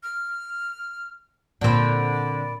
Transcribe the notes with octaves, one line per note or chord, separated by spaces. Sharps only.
F6
A#2 D3 C4 D4 A#4 D5 B5